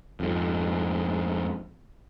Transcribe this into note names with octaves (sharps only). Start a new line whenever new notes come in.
F2 G#2